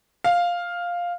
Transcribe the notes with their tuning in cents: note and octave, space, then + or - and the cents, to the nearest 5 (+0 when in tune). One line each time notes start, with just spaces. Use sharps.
F5 +5